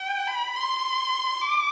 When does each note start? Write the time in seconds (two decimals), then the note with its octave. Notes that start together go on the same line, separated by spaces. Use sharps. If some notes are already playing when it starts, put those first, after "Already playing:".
Already playing: G5
0.28 B5
0.56 C6
1.42 D6